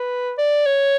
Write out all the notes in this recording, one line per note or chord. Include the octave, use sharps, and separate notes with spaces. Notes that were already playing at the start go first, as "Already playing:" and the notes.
Already playing: B4
D5
C#5